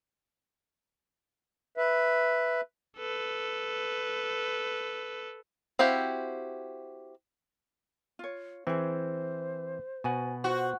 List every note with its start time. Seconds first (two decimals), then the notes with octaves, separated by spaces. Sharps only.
1.77 B4 E5
2.97 A4 B4
5.79 C4 E4 F#4 G4 F5
8.19 F4 C#5
8.67 E3 C4 E4 G#4 C5
10.04 B2 F#4 F#5 G#5
10.44 F4 F#4 C5